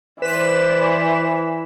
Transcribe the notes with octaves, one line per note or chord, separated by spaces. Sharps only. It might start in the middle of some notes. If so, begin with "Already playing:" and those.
E3 B4 C5 D5 B6 E7